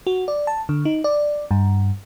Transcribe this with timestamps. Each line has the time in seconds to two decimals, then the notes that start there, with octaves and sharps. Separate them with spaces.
0.07 F#4
0.28 D5
0.47 A5
0.69 D3
0.85 D#4
1.04 D5
1.51 G2